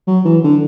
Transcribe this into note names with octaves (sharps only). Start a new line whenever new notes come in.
F#3
E3
D3